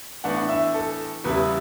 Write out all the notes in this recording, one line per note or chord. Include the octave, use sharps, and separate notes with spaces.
A2 E3 B3 D4 F#5
E5
A4
E2 C#3 G3 B3 E4 B4